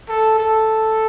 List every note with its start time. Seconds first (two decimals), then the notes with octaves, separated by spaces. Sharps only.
0.09 A4
0.38 A4